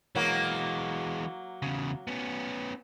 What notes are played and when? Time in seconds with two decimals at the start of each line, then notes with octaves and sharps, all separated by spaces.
0.15 E3 F#3 G#3 A#3
1.62 E2 C#3
2.08 B3 C#4